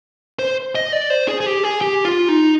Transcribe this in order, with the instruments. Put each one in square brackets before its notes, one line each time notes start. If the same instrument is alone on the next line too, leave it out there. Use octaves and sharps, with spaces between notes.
[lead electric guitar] C5
D#5
D5
C5
G#4
G#4
G4
G#4
G4
F4
D#4